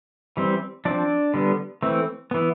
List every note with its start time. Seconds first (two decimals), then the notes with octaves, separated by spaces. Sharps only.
0.37 E3 G3 C4
0.85 F3 C4 D4 D5
1.34 D3 G3 B3
1.82 E3 A3 C4
2.31 E3 B3